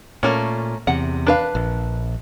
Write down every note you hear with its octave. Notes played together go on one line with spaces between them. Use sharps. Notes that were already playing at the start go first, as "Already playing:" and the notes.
A#2 A3 A#3 C#4
E2 C3 F#5
D4 B4 F5
A#1